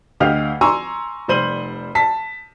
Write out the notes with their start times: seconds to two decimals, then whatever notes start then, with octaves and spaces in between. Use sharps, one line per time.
0.20 D2 G4 D#5 F5 F6 F7
0.61 G#5 A#5 C6 C#6 E6
1.28 F1 G3 C5 D#7 F#7
1.95 A5 B6